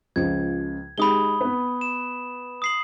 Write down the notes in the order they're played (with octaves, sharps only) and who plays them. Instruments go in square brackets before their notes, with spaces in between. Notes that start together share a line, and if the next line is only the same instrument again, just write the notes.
[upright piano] C#2 C#3 F3 [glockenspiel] G#6
[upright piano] G#3 D#4 G4 [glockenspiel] B5 D#6 G7
[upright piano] B3 B4
[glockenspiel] E7
D#6 C7 F#7